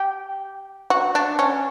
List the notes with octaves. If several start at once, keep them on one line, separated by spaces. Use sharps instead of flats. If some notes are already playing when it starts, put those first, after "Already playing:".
Already playing: G4
F#4
D4
C#4